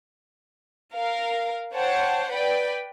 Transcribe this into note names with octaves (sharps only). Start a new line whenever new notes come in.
A#4 F5
C5 C#5 F#5 G5 A5
B4 D5 G5 B5